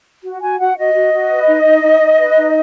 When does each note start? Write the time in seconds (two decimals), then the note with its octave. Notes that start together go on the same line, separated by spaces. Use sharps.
0.24 F#4
0.42 F#4 G#5
0.59 F#4 F#5
0.78 F#4 D#5
0.94 F#4
1.13 F#4
1.30 B4
1.48 D#4
1.65 D#4
1.83 D#4
2.01 D#4
2.18 B4
2.36 D#4